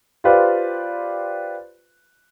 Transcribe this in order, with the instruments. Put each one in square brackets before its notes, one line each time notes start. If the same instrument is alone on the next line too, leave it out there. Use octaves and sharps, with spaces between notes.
[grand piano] F4 G4 B4 C5 D5 F5